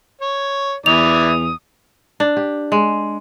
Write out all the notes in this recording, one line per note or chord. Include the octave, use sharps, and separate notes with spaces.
C#5
E2 E3 E4 D5 D#6 F7
D4
G4
G#3